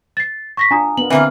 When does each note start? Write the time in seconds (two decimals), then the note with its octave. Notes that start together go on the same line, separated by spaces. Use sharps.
0.17 A6 C7
0.57 C#6 A#6 B6
0.71 D4 F4 G#5 A#5 D#6
0.98 B3 D4 A#4 F#7
1.10 D3 E3 A#3 C4 F4